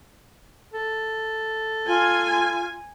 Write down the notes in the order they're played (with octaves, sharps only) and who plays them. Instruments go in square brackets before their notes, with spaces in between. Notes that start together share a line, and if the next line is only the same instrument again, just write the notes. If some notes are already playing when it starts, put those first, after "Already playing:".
[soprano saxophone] A4
[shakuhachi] F4 [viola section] G#5